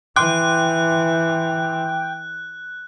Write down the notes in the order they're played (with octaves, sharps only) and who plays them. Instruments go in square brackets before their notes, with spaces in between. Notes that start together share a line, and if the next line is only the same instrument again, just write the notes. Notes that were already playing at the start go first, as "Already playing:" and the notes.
[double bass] E3 [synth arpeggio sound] G5 [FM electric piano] C6 D6 [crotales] F#6